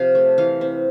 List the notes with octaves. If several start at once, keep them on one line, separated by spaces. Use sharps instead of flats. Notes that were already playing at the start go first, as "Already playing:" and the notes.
Already playing: C3 F3 F5
A3
E3 F5
C4